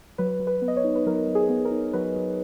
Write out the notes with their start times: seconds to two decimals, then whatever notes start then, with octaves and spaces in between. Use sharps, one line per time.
0.18 F#3 B4
0.40 F#3
0.47 B4
0.62 B3
0.68 D#5
0.77 C#5
0.84 D#4
0.95 B4
1.06 F#3 A#4
1.27 F#3
1.35 G#4
1.49 B3
1.65 A#4
1.71 D#4
1.93 F#3 B4
2.16 F#3